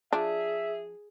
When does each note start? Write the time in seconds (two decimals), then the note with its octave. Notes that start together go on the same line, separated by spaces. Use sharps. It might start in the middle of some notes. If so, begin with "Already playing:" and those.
0.13 F3 D4 G#4 E5